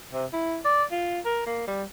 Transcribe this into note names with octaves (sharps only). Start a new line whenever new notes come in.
C3
E4
D5
F4
A#4
A#3
G3